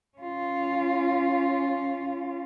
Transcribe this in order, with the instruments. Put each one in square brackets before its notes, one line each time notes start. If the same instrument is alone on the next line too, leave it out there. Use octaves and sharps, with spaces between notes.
[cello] C#4 F4